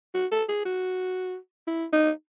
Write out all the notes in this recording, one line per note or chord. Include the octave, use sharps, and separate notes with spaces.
F#4
A4
G#4
F#4
E4
D#4